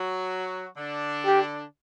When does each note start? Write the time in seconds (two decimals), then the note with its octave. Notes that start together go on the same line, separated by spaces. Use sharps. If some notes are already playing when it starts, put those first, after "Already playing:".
Already playing: F#3 F#4
0.76 D3 D4
1.25 G4